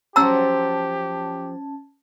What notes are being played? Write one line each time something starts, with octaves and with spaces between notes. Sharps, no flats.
F3 F#3 C#4 F#4 G4 A5 A#5 E6